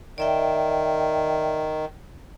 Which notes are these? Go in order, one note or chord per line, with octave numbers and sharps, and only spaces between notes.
D#3 D5 E5 G5